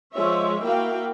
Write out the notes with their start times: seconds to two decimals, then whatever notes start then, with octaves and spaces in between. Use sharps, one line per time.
0.13 F3 G#3 C#5 E5
0.64 A#3 E4 F#4 F5 G5